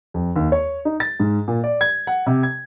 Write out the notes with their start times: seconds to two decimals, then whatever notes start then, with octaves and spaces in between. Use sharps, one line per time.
0.14 F2
0.36 D#2
0.52 C#5
0.85 D#4
1.00 A6
1.20 G#2
1.48 A#2
1.64 D5
1.81 G#6
2.07 F#5
2.26 C3
2.43 G#6